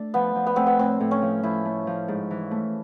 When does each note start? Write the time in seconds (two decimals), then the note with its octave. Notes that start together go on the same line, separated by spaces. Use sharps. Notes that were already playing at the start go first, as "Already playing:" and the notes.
Already playing: A3 D4
0.14 F3 B3
0.35 F3
0.47 B3
0.56 A3 C4
0.67 B3
0.78 A2 C4
1.00 A2
1.11 C#4
1.22 F3
1.43 F3 E4
1.65 A3
1.87 F3
2.08 G#2
2.31 E3
2.51 A3